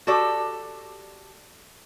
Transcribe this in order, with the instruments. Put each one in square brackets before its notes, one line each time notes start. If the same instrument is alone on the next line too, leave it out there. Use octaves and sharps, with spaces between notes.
[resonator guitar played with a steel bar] F#4 G4 A4 D5